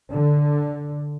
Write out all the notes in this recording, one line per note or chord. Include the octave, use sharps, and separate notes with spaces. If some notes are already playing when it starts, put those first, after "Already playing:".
D3